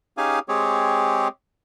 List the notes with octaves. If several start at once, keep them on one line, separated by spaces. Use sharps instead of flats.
C#4 D#4 G4 G#4 F5 G#5
G#3 C4 G4 G#4 C#5